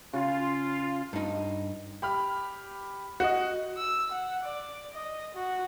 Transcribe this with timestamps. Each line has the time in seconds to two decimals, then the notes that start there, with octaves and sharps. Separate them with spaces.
0.13 C#3 F4
1.13 G2 D#4
2.02 G4 B5 F6
3.20 F#4 D#5
3.78 E6
4.12 F#5
4.43 D5
4.94 D#5
5.35 F#4